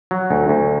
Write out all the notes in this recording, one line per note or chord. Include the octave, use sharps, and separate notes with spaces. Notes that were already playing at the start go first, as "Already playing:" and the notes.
F#3
D2
D2